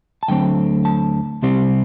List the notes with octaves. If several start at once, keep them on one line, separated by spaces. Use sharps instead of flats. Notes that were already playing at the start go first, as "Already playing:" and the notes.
A5
D2 D3 F#3 A3 C4 G5
A5
C2 C3 G3 C4